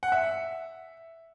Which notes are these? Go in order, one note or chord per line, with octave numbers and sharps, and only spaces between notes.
F#5
E5